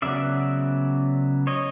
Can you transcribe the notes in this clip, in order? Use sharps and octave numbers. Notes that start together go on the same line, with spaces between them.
C#3 F#3 B3 D5 E5
C#5 D#5